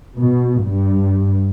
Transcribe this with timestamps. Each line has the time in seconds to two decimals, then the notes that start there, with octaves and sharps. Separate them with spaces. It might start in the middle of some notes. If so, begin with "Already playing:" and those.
0.21 B2
0.63 G2